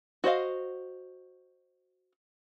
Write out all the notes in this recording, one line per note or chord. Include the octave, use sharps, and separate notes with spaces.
F#4 C5 D#5 F5